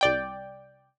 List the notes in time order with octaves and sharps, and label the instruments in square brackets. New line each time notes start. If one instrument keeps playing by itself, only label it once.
[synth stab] C2 D5 G5